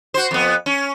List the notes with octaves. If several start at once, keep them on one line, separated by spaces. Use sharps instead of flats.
F#4 C5
F2 B3
C#4